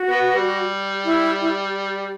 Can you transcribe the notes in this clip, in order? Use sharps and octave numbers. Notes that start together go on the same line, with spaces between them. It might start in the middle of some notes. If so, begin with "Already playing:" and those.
Already playing: F#4
B3
G3
E4
E4